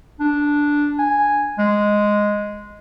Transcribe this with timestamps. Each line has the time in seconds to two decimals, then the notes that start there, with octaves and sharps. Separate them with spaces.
0.20 D4
0.99 G#5
1.58 G#3